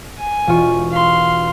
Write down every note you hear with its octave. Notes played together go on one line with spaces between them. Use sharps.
G#5
E1 F4 C#5
F5 C6